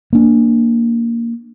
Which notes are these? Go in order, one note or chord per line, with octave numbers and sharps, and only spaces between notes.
A#3 D4